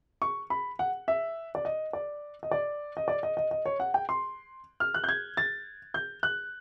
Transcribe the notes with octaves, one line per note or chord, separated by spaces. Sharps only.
C#6
B5
F#5
E5
D5
D#5
D5
D#5
D5
D#5
D5
D#5
D#5
D#5
C#5
F#5
G5
C6
F6
F#6
G6
G#6
A6
G6
F#6